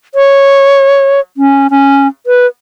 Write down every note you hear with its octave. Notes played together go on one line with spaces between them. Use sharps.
C#5
C#4
C#4
B4